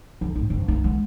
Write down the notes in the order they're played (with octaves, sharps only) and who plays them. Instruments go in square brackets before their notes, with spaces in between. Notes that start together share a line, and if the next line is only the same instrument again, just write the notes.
[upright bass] F2
G#1 A2
F#1
A3 E4
G#3 B3